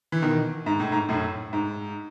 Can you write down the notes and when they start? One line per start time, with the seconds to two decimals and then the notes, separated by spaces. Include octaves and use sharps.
0.12 E3
0.22 B2 D#3
0.66 G#2
0.80 A2
0.92 G#2
1.09 F#2 A2
1.53 G#2